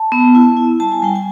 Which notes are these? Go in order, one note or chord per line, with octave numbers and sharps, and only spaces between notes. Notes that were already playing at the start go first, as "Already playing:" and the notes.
Already playing: A5
B3
E4
E4
G3 A5
G#5
G3 G5
G#5